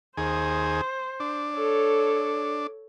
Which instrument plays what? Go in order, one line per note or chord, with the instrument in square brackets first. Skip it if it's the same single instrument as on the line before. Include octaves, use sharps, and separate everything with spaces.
[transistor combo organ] D#2 G#4 [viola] C5
[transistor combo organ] D4
[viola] A4 C#5